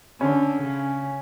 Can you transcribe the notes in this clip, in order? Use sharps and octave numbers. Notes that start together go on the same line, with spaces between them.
D3 C#4
C#3